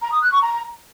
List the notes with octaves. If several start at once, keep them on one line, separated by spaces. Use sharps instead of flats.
A#5
D#6
F#6
C#6
A#5